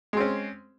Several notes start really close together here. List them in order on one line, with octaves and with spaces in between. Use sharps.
G#3 C4 C#4